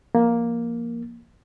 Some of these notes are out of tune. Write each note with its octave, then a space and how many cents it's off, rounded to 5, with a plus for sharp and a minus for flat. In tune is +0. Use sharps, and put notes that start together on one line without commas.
F3 -20 A#3 +5